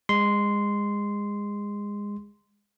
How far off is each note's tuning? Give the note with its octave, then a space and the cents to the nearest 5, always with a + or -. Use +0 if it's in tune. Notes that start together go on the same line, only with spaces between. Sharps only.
G#3 -25 C6 -10